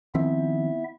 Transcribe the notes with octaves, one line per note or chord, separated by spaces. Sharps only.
D#3 F3 B3 C4 E4 E5